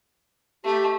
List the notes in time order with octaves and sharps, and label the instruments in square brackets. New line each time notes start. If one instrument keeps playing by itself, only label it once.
[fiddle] A3 [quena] G4